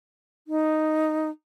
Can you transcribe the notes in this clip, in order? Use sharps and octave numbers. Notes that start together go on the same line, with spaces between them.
D#4